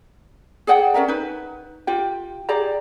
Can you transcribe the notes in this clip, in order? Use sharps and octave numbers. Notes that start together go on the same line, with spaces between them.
G#4 D5 F#5 G5
C#4 A#4 E5 A#5
D#4 B4
F4 G4 G5
G4 G#4 D5 A#5